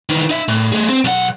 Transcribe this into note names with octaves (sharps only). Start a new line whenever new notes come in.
D#3 E3
D#4 E5
A2
A3 G#4
C4
B1 F#5